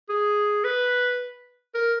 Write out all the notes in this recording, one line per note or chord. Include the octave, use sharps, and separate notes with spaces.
G#4
B4
A#4